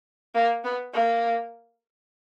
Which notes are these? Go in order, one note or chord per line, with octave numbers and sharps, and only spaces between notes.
A#3
B3
A#3